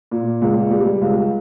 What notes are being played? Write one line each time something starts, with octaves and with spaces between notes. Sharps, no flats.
A#2
C#2
G3
C#2